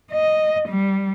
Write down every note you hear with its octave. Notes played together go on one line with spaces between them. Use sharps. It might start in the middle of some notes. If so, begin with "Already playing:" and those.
D#5
G3